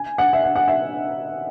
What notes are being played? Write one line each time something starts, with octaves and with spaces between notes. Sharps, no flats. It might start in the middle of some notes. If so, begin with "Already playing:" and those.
Already playing: G#5
F#5
E5
F#5
F#5
E5